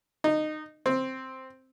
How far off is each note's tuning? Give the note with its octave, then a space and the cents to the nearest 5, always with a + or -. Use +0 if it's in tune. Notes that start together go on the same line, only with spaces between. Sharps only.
D#4 -20
C4 +5